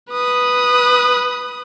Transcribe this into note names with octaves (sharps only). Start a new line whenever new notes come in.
B4 D#6